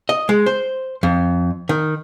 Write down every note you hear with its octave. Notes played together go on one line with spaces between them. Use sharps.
D#5
G#3
C5
F2
D#3